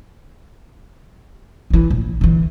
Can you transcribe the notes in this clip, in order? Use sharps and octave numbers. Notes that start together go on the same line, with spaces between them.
D#3 E3
A#1
D3 E3